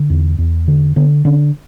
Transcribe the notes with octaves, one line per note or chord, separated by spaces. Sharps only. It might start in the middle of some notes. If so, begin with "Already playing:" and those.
Already playing: D3
E2
E2
D3
D3 B3
D3 C#4